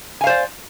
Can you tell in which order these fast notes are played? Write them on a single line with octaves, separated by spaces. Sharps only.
G#5 F5 C5 D5